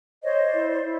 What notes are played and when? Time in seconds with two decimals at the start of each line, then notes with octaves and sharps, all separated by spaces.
0.23 C5 C#5 D#5
0.46 D5
0.54 E4
0.68 D5
0.83 E4